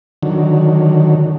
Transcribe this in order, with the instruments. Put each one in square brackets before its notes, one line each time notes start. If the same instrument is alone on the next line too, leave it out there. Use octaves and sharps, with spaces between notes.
[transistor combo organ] D3 D#3 F#3